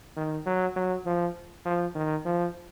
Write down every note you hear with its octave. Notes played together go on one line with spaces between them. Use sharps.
D#3
F#3
F#3
F3
F3
D#3
F3